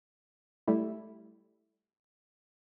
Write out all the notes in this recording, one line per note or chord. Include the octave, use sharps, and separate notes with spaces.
G3 A3 E4